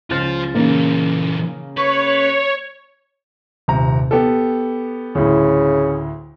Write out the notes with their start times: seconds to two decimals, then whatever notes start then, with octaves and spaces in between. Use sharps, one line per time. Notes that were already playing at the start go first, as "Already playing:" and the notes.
0.10 C#2 F4 C5 F6 A6
0.55 A#2 C#3 E3 A#3
1.77 B4 C#5
3.68 D#1 C3 A#5
4.11 B3 G4 A4
5.15 D2 A2 C#3